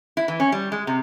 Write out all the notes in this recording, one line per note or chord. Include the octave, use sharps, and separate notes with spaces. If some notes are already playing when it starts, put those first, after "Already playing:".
E4
E3
C#4
G3
G#3
C3